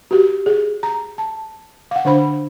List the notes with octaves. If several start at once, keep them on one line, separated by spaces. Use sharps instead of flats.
F#4 G4
G#4
A#5
A5
F5 F#5
D3 D4 C5 B5